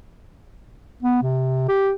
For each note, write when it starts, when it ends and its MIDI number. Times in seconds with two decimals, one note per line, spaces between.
1.03 1.21 59
1.23 1.67 48
1.68 1.91 67